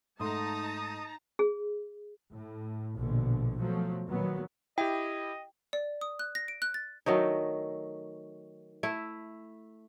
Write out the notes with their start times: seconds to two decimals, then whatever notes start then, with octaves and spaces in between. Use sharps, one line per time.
0.20 G#2 A3 D#4 A5 A#5 C6 D#6
1.39 G#4
2.34 A2
2.96 A#1 B2 D3
3.58 B2 F3 F#3 A3
4.09 A#2 D#3 F#3 B3
4.78 E4 G4 D#5 G5
5.73 D5
6.01 D#6
6.19 F#6
6.35 A#6
6.48 D7
6.62 F#6
6.74 A6
7.06 D#3 F#3 A3 D#4
8.83 A3 E4